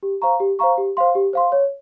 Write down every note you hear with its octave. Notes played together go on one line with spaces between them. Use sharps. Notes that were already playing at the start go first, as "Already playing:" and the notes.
G4
C5 F5 A#5 C#6
G4
C5 F5 A#5 C#6
G4
C5 F5 C6
G4
C5 F5 C6
C#5